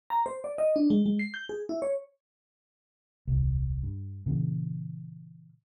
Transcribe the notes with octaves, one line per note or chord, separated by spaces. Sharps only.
A#5
C5
D5
D#5
D4
G#3
G#3
C7
G6
G#4
E4
C#5
D#1 C2
G2
A#2 C#3 E3